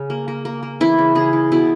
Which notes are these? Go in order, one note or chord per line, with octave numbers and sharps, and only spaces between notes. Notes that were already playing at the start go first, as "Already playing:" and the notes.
Already playing: C#3
A#3
A#3
A#3
A#3
E3 E4
C#3
C#3 G#4
E3
B2 E4